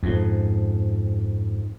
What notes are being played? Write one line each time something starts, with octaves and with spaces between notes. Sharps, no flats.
F2 G#2